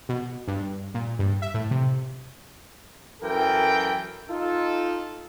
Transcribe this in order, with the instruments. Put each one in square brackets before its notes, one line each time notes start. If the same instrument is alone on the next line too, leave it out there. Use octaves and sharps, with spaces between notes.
[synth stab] B2
G2
A#2
G2
E5
A2
C3
[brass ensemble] F#2 E3 A4 A#4 G5
D#4 F4 A4